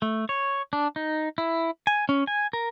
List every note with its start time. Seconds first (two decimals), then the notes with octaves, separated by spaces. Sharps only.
0.02 A3
0.29 C#5
0.73 D4
0.96 D#4
1.38 E4
1.87 G#5
2.09 C#4
2.27 G#5
2.53 A#4